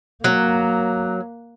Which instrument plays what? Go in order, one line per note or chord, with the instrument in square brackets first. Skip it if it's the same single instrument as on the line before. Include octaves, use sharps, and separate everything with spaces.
[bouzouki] F#3 [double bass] A#3